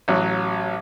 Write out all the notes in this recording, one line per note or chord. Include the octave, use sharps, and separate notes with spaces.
A1 F#3